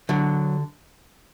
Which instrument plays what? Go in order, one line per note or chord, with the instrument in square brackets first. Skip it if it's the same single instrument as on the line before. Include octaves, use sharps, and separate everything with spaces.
[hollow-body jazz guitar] D3 F#3